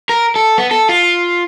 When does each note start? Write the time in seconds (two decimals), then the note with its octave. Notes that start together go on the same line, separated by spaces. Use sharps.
0.09 A#4
0.36 A4
0.58 B3
0.71 A4
0.89 F4